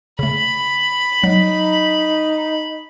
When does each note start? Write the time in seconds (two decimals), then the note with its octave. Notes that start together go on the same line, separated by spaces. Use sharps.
0.19 C#3 A3 B5
1.23 F#3 D#4